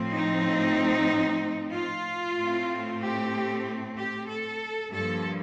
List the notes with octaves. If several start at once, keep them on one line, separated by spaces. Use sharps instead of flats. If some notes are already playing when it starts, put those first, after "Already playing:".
Already playing: A2 F3 C4
D#4
F4
A2 A3 C4
G4
G4
A4
G2 F3 A#3 A4